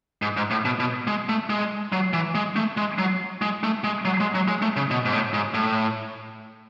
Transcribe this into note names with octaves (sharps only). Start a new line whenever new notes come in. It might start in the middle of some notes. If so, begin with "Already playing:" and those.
G#2
G#2
A2
B2
B2
G#3
A3
G#3
F#3
E3
G#3
A3
G#3
F#3
G#3
A3
G#3
F#3
G#3
F#3
G#3
A3
C#3
B2
G#2
A2
G#2
A2